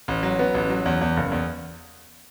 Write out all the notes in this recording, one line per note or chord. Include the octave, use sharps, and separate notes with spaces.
A1
F#3
B3
A1
F#3
E2
E2
F#1
E2